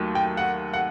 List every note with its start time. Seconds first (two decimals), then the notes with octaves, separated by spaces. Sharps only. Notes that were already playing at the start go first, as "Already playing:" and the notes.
Already playing: D#2 D#3 F#3 A3
0.15 G5
0.37 F#5
0.73 F#5